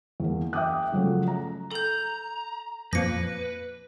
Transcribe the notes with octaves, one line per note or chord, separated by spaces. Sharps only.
E2 A#3
E5 G5 D6 D#6 F#6
C#3 F3 F#3 A3
A#5
A4 A#5 G6
F2 A#2 B4 A#6 C#7